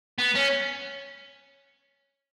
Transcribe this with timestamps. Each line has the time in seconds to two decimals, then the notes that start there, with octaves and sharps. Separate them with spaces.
0.18 B3
0.35 C#4